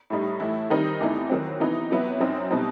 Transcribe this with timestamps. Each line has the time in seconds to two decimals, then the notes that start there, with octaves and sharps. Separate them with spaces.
0.10 A2 G3 D#4
0.40 A2 E3 A3 E4
0.70 D#3 G3 C4 D#4
1.00 E2 C3 E3 A3 D#4
1.30 D#3 F#3 C4
1.60 C3 E3 B3 D#4
1.91 C3 F#3 B3 E4
2.20 F#2 F#3 C4 D#4
2.51 B2 G3 C4 D#4